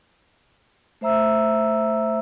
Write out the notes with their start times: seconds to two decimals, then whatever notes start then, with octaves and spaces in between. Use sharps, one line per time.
1.01 A3 C5 E5 A#5 E6